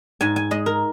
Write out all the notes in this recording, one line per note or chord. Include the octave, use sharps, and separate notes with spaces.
G#2 G#5
G#5
G#3 D#5
A#4